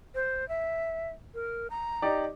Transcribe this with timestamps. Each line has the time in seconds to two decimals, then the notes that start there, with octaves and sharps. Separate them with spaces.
0.15 C5
0.49 E5
1.34 A#4
1.70 A#5
2.02 D#4 G4 D5